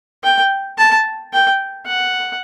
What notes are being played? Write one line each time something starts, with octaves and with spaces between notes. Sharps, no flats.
G5
A5
G5
F#5